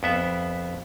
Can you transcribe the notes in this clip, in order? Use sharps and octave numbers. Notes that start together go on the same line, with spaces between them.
F2 B3 E5